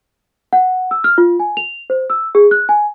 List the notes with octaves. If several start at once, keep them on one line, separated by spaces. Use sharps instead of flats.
F#5
E6
F6
F4
G#5
F7
C5
E6
G#4
F#6
G#5